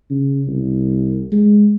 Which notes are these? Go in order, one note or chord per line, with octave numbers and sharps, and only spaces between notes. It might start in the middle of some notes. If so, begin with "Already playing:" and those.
C#3
C2
G#3